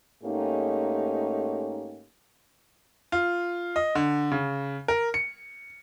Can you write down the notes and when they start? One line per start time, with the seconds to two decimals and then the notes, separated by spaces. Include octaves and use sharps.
0.23 G#2 A3 A#3 C#4 D#4 G4
3.12 F4
3.76 D#5
3.95 D3
4.32 C#3
4.88 A#4
5.14 C#7